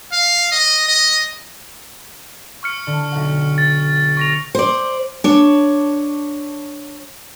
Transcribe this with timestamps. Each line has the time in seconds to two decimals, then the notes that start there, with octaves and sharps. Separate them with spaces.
0.12 F5
0.52 D#5
0.88 D#5
2.63 C#6 F6 C#7
2.87 D3
3.12 B1 F#5
3.58 A6
4.17 C#6 A#6 F7
4.55 C5 D5
5.24 D4 C#5